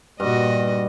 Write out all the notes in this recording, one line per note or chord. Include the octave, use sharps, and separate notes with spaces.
G2 A#2 F#4 D#5